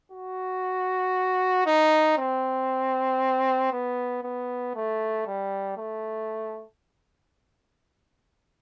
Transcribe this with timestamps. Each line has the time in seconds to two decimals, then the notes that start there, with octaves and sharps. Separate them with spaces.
0.12 F#4
1.66 D#4
2.17 C4
3.72 B3
4.23 B3
4.75 A3
5.27 G3
5.78 A3